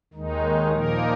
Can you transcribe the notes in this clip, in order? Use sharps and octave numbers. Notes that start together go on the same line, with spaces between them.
D#2 D#3 G#3 D#4
A#2 F3 A#3 D#4 A#4